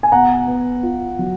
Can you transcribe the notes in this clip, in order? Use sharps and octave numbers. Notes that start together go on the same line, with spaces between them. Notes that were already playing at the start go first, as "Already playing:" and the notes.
G#5
B2 F#5 A#5
B3
F4
F#3